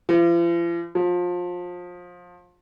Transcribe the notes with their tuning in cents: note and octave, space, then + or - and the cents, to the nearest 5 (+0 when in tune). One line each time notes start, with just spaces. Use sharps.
F3 -45
F3 +25